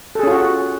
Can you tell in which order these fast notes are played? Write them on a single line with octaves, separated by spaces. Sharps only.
A4 G#4 C#4 F4 F#4